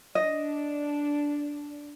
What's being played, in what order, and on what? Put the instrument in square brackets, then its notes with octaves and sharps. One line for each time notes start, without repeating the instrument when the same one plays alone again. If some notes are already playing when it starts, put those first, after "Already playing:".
[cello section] D4 [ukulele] D#5